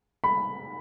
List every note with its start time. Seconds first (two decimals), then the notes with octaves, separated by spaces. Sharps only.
0.24 B5